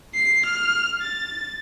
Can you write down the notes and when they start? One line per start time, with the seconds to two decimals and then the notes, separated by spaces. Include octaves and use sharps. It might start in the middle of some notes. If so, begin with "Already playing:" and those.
0.15 C7
0.45 F6
1.02 A6